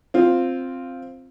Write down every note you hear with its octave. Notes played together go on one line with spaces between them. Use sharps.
C4 F4